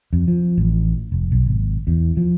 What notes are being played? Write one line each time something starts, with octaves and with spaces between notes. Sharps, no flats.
F2
F3
A1
F1
B1
G#1
E2
F3